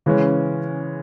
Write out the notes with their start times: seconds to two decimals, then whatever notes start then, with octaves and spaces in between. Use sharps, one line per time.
0.06 C#3 E3 G#3 C#4